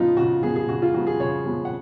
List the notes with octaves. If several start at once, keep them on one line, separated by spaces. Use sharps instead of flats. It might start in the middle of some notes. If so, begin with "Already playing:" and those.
Already playing: C#3 F3 B3 D#4 F4
C#3 F#4
F3 B3 G#4
G#4
C#3 F#4
F4
F3 B3 F#4
G#4
C#3 C#5
F3 B3
F#5